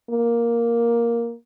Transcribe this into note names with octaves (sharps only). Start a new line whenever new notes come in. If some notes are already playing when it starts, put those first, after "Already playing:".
A#3